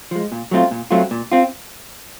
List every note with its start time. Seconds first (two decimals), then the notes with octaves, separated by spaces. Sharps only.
0.11 F3 G#3
0.32 A#2
0.51 F#3 A3 C4 F4
0.71 A#2
0.91 F#3 A3 C4 F4
1.11 A#2
1.32 C4 F4